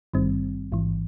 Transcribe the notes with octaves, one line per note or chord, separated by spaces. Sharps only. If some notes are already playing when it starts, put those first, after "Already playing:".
G#1 G2 D#3 G3 C4
A1 G#2 E3